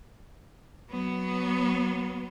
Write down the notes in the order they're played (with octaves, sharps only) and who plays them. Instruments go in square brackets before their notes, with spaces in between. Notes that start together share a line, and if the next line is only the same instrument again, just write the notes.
[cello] F#3 B3